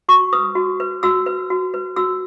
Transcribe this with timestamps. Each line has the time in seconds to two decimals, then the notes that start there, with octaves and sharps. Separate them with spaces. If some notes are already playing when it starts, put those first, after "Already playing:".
0.09 F#4 C#6
0.33 B4 D#6
0.55 F#4
0.80 B4
1.03 F#4 E6
1.26 B4
1.50 F#4
1.74 B4
1.96 F#4 E6